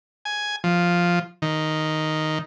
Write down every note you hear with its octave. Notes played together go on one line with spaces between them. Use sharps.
G#5
F3
D#3